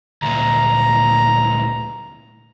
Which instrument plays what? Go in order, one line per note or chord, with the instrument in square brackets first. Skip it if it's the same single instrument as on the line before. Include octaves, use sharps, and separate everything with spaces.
[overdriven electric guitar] D2 A#2 [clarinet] A#5